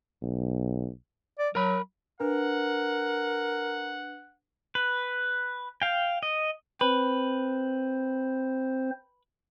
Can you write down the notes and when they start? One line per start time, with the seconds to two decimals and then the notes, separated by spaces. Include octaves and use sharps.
0.22 B1
1.39 D5
1.55 F#3 A#4 B5
2.20 D4 A#4 B4 F#5
4.75 B4
5.82 F5 G5
6.23 D#5
6.81 C4 B4 C5